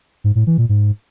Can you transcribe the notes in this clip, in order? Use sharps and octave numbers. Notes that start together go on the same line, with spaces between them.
G#2
A2
E3
A#2
G#2